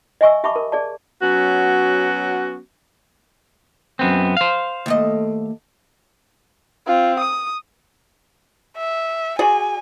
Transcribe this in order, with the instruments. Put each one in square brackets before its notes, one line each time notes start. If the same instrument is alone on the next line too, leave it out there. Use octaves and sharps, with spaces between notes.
[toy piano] D#5 E5 G#5 C#6 E6
G4 E5 A5 B5 C#6 D6
A#4
G#4 D5 A5
[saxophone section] F#3 B3 C#4 F#4
[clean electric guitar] F#2 B3 C4
C5 F5
[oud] D#2 A3 D#5
[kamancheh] C4 F4
D#6
[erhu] E5
[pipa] F#4 G#4 D5 [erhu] G#5